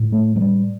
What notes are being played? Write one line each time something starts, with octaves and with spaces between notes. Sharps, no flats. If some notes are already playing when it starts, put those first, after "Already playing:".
Already playing: A2
A3
F#3
G3